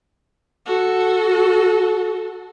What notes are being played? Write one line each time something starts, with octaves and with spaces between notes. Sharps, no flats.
F#4 A4